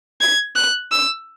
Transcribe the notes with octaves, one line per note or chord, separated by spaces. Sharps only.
G#6
F#6
E6